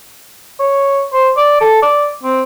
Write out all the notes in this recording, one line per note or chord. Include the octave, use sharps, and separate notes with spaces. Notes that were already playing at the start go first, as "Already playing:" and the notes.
C#5
C5
D5
A4
D5
C4